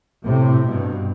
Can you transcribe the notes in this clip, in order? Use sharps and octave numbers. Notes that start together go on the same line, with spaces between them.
A2 C3
G2 B2